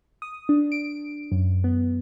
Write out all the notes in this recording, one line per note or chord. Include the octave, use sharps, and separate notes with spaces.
D#6
D4
D7
F#2
B3